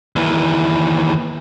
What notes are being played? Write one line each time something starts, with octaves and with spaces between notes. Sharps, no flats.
D#2 E3